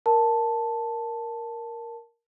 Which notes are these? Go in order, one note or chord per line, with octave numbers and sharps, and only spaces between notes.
A#4 A5